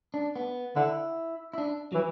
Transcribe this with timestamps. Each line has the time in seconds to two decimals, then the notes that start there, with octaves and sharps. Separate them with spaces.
0.14 D4
0.36 B3
0.76 D3 E4
1.54 E4
1.58 D4
1.92 E3 F#3